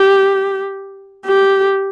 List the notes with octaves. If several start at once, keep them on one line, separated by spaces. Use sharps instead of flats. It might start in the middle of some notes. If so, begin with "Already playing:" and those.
Already playing: G4
G4